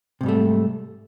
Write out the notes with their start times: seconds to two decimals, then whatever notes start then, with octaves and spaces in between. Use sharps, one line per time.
0.21 C3
0.23 G#2
0.26 G3
0.28 A3